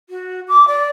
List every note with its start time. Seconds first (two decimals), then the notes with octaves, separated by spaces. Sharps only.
0.09 F#4
0.48 D6
0.67 D5